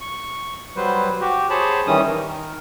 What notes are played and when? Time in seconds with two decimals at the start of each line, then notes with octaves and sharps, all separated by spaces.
0.01 C#6
0.76 F#3 G3 B4 C5
1.21 F#4 G4
1.50 G#4 C5 C#5 A5 B5
1.87 D#3 E3 G3 C#4 D#6
2.07 D#3 A#4